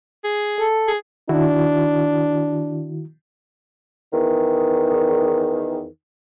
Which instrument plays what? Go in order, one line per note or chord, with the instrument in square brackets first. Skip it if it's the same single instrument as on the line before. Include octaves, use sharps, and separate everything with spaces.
[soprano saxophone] G#4
[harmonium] A4
[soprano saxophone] G#4
[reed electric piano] D#3 E4 F#4 [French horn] D4
[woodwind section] E2 D#3